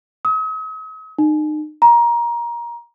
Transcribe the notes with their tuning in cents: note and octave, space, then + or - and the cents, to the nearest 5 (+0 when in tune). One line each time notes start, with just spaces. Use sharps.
D#6 +45
D#4 -35
A#5 +20